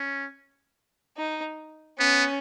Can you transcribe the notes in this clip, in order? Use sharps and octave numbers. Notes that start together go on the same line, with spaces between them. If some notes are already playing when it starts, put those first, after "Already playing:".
Already playing: C#4
D#4
B3 C#4